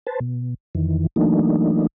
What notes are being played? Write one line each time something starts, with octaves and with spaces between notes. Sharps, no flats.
B4 C5 A5
B2
F2 D#3 E3
E3 F#3 A3 A#3 D4 D#4